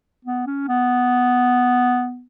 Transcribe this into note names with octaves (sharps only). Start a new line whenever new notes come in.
B3
C#4
B3